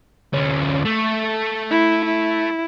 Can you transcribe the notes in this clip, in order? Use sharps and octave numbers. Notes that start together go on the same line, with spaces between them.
D2 C#4
A3
E4
E4